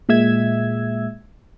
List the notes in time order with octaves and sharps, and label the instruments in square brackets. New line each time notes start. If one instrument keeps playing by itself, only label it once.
[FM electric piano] A#2 G#3 E5 E6 G#6